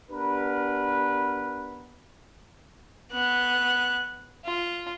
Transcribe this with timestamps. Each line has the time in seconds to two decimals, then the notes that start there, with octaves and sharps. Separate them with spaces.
0.11 B3 D4 G4 A#4 B4
3.12 B3 F#6
4.45 F4